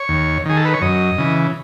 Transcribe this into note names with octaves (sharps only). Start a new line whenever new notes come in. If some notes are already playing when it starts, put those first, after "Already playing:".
Already playing: C#5
D#2
D#3 G#4
A4
B4
C#5
F#2 D#5
C#3 E3